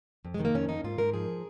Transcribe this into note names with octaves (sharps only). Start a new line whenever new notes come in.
F2
D#3 G#3
A#3
F2 C#4
F2 D#4
G#2 F4
G#2 A#4
F3 G#4